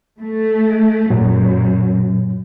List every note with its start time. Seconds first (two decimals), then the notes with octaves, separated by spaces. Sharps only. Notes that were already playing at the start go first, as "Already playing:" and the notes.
0.19 A3
1.10 F#2 A#2 F#3